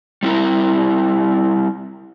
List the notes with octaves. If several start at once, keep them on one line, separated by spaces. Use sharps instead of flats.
G3 C4 E4 A#4